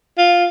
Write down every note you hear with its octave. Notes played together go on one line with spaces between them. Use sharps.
F4